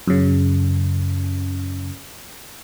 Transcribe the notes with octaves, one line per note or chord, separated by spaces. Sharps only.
F#2 C#3